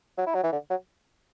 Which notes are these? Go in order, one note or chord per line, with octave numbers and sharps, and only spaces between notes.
F#3
E4
F#3
E3
D3
F#3